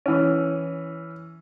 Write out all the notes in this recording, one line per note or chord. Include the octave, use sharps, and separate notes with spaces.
E3 C#4